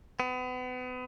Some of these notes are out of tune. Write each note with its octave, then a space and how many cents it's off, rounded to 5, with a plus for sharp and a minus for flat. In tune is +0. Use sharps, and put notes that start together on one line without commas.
B3 +35